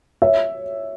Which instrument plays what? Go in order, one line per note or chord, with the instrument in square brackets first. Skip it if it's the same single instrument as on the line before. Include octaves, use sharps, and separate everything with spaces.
[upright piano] C#5 E5